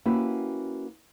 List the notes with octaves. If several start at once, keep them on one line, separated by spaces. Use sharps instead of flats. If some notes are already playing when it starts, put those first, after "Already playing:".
A#3 C#4 E4 F#4 G4 B4